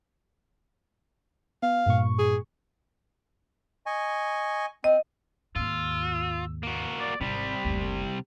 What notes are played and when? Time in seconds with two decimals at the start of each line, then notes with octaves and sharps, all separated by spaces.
1.63 B3 F5
1.86 G2 A#2 C#6
2.18 G#4
3.86 D#5 G#5 C#6
4.84 C4 D#5
5.56 D#2 G#2 F4 E6
6.63 A#3 F#4
7.00 D5
7.21 G#1 C3 G3 E4 B5
7.64 F#1 D2